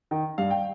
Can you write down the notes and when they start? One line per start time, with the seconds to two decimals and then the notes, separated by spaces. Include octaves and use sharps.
0.11 D#3
0.38 G2 F5
0.51 G5